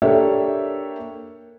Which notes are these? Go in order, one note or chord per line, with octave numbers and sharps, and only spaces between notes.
A#3 D4 G4 A4 C#5 E5